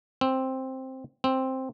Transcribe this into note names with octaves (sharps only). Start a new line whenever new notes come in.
C4
C4